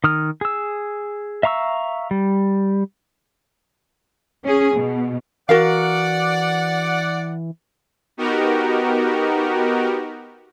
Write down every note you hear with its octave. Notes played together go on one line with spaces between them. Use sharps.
D#3 D#6 F6
G#4 E6
E5 F5 A#5 C#6 E6
G3
C#4 G#4
B2
E3 F#4 A#4 D5 F5 F#5
B3 D#4 F#4 G4 A#4